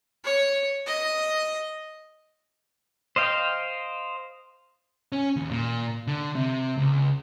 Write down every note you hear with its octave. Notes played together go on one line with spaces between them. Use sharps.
C#5
D#5
C5 D#5 F5 G5
C#4
D#2
A#2
D3
C3
C#2